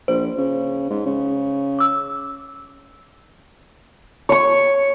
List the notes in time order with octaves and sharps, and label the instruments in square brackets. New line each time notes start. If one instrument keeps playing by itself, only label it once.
[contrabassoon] A#1 [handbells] C5
[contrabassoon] C#3
G#2
C#3
[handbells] D6 E6
[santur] C#5 C#6